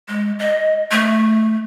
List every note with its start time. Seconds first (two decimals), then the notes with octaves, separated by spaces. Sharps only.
0.08 G#3
0.39 D#5
0.91 A3